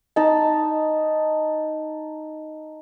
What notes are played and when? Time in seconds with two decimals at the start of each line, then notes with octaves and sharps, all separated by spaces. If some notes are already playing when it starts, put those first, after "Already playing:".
0.16 D#4 A5